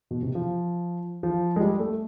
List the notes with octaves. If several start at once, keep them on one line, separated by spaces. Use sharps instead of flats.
B2
C3
F3
F3
G#3
G3
A3